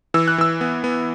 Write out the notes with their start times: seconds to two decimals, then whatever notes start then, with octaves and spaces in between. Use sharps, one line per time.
0.14 E3 E6
0.28 F#6
0.38 E3 E6
0.61 B3
0.84 B3